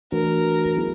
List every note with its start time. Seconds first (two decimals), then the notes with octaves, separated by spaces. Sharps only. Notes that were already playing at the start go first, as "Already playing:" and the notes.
0.12 E3 A3 D4 F#4 A#4 B4
0.77 F#3 B3 E4 G#4